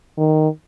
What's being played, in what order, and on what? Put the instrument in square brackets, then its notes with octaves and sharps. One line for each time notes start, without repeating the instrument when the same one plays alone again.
[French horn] D#3